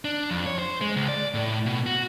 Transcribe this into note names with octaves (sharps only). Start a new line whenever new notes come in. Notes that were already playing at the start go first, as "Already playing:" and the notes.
D4
F2
C#5
C5
G#3
C#2
D5
A2
B2
F#4